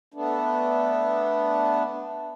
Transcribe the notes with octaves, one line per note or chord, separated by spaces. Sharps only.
A3 B3 D4